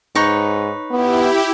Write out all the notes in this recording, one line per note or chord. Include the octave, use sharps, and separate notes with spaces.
G#2 D#4 B4 C#5
B3 E4 G4